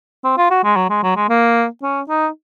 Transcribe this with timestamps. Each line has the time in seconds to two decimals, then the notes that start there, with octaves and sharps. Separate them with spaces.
0.24 C4
0.38 F4
0.50 F#4
0.64 G#3
0.76 F#3
0.90 G#3
1.03 F#3
1.16 G#3
1.29 A#3
1.83 C#4
2.09 D#4